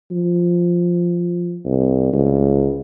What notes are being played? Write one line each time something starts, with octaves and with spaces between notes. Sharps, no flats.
F3
C2
C#2